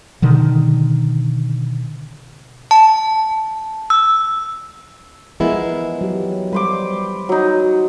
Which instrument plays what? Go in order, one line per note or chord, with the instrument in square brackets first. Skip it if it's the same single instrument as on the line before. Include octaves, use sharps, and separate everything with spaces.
[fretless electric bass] B2 D3 D#3
[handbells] A5
E6
[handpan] E3 F3 A#4 [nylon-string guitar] G#3 B3 E4
[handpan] F#3 G4
[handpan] G3 [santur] B4 C5 D6
[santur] F#3 D#4